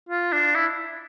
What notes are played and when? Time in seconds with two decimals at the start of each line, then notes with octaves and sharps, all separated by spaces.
0.09 F4
0.32 D4
0.55 E4